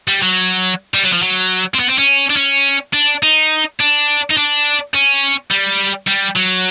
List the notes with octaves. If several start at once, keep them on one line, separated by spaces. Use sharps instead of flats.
G3
F#3
G3
F#3
F3
F#3
C4
B3
C4
C#4
D4
C#4
D4
D#4
D4
D#4
D4
C#4
G3
G3
F#3